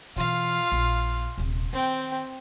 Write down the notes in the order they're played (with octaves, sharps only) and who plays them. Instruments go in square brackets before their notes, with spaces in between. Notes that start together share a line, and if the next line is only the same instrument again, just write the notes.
[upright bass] B2 E3 [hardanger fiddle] F4 F5
[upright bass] A#1 D#4
D#1 C3
[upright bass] D#3 [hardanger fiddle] C4 G5